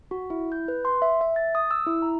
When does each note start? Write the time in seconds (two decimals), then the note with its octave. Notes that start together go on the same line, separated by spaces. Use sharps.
0.11 F#4
0.30 E4
0.52 G6
0.68 B4
0.85 C6
1.02 E5
1.21 E5
1.36 A6
1.55 D#6
1.71 E6
1.87 E4
2.02 A#5